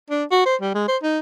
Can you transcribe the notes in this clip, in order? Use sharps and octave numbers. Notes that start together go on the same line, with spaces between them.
D4
F#4
C5
G3
G#3
C5
D#4